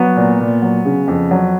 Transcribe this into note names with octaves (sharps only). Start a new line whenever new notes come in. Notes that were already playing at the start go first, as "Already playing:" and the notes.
Already playing: F#3 B3
A#2
A#2
F#3
C#3
F2
F#3